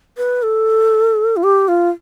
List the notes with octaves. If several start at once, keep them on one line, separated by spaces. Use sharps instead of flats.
B4
A4
F4
G4
F4